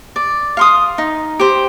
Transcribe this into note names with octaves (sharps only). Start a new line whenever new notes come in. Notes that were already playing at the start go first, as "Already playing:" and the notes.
D5
F5 C6 D#6
D#4
G4 C5